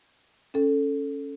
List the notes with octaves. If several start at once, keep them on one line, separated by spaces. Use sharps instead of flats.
C#4 A4